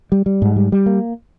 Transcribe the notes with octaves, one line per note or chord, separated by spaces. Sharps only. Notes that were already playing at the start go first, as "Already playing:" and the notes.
G3
G3
G#2
G3
G3
A#3